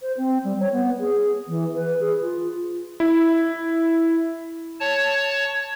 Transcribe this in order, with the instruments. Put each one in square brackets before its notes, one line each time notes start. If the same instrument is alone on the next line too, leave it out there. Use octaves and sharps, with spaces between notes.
[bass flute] C5
C4
G3
C#5
B3
G#4
E3
B4
G#4
F4
[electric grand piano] E4
[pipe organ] C#5 A5